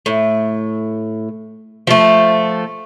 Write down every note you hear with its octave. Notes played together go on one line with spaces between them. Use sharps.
A2
F3 A3